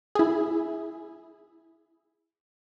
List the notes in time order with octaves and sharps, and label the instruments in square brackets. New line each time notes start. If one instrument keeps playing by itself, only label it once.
[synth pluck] E4 G#4